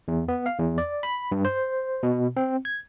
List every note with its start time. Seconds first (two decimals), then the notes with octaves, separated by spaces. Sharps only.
0.08 E2
0.28 B3
0.46 F5
0.58 E2
0.78 D5
1.03 B5
1.32 G2
1.45 C5
2.03 B2
2.37 C4
2.65 G#6